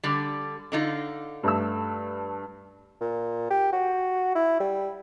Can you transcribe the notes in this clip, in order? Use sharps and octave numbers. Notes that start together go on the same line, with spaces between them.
D3 G3
D3 D#4 F4
G2 A3 E6
A#2
G4
F#4
E4
G3